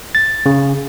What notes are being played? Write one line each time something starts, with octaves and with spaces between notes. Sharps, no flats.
A6
C#3